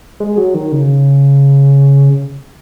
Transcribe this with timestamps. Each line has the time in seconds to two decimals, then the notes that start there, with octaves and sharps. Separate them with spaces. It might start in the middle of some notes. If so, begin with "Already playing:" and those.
0.20 G#3
0.37 F#3
0.54 D#3
0.72 C#3